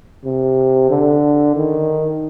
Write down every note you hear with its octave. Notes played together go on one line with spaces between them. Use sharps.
C3
D3
D#3